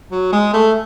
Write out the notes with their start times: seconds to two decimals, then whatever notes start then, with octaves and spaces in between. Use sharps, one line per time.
0.12 F#3
0.33 G#3
0.53 A3